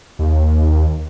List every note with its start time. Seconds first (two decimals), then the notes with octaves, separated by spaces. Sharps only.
0.19 D#2